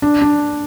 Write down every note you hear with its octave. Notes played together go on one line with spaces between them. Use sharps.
D4
D4